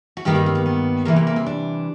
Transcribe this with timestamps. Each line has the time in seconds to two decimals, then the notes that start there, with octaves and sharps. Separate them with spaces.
0.17 F#4
0.25 G2 D#3 G3 A#3 G4
0.36 D#4
0.46 C4
0.55 B3
0.66 B3
1.05 C3 E3 G3 A#3 B3
1.16 A#3
1.27 A#3
1.36 C4
1.46 D4